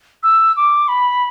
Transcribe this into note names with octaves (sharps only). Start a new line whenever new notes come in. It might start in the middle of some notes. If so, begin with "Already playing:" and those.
E6
D6
B5